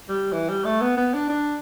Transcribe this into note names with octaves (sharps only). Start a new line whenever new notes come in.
G3
E3
G3
A3
B3
B3
D4
D4